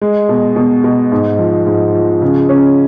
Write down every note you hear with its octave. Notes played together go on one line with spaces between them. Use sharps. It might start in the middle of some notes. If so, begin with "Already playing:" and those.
G#3
B2
B2
B2
G#2
F3
G#2
F3
C#3
C#4